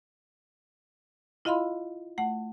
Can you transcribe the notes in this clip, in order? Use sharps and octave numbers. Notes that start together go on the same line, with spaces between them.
E4 F4 D#5 F5 B5 C6
A3 F#5